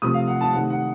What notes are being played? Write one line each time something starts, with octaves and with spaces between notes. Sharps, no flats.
C3 F3 A3 D#6
F5
F#5
A5
C3 D#3 A3 F#5
F#5